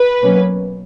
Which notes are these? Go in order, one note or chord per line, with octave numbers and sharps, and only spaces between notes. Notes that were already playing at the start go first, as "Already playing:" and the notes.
Already playing: B4
B2 F#3 A#3 C#4